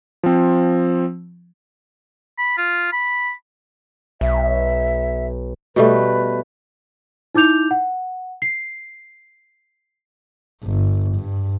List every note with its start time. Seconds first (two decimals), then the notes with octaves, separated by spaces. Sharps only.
0.23 F3 C4
2.38 B5
2.58 F4
2.93 B5
4.21 B1 E5
5.76 B2 G3 A3 B4
7.35 D#4 E4 D6 G6 F7
7.71 F#5
8.42 C7
10.64 G1
11.15 G2